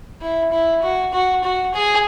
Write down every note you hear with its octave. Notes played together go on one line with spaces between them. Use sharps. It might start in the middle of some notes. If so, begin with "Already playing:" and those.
E4
E4
F#4
F#4
F#4
G#4